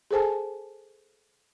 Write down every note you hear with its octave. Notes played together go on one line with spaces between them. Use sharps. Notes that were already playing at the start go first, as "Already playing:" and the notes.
G#4 A4 C5 G#5 A5